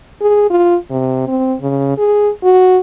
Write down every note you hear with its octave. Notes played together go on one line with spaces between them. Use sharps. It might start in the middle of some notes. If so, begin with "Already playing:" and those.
G#4
F4
C3
C4
C#3
G#4
F#4